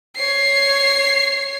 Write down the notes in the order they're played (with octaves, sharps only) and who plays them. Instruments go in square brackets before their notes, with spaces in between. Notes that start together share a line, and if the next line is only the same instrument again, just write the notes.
[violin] C#5 C7